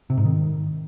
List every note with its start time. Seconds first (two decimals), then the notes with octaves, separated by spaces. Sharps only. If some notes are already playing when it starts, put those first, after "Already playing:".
0.10 C3
0.17 G#2
0.25 D#3